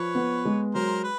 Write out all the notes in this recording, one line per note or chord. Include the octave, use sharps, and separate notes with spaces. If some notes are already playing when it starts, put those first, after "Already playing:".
Already playing: F3 B4 C#5
B3
G#3
F#3 A#4 C5
B4